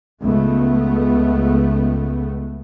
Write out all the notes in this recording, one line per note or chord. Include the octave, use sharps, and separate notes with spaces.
C#2 A3 B3